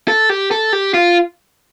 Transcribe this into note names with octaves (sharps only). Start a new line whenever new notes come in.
A4
G4
A4
G4
F4